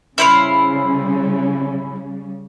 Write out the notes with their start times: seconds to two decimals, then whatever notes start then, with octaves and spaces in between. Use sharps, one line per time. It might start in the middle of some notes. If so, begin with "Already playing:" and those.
0.18 C#3 G3 E4 C5 F5